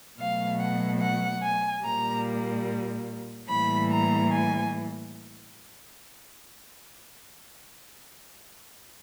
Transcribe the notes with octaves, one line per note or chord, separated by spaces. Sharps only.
B2 F#3 A3 F5
F#5
F#5
G#5
A#2 G3 A#3 A#5
A2 E3 G3 A#3 B5
A#5
G#5